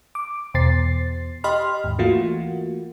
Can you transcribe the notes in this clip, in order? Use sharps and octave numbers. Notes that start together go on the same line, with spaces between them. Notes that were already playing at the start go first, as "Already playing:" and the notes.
D6
E2 B2 C5 A6 C7
G4 D#5 B5 C6 F6
D#2 G#2
E3 A3 A#3 F4 F#4